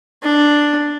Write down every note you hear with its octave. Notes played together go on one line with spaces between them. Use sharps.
D4